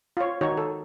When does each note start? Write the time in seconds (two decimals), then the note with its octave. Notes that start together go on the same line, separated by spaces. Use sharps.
0.17 F4 C#5
0.41 D#3 D#4 F#4 C#5
0.57 A4